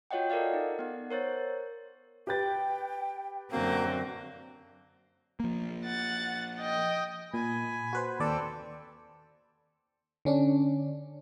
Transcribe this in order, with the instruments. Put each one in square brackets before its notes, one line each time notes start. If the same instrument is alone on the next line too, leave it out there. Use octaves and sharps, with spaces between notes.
[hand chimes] F4 F#4 C#5 D#5 F#5 G5
A4 A#4 D5 D#5 F5
D#4
B3 F#5
A#4 C5 C#5 A6
[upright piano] G4 B4 A6 [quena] G5
[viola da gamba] F#2 D3 C4 [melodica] A#3 [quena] F#4
[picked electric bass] F3 A#3
[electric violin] F#5 A6
D#5 G5
[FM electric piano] A#2 [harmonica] G#5 B5
[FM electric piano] F#4 B4 C5
[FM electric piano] D#2 D5 [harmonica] C4 A4
[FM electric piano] D3 C#4 D4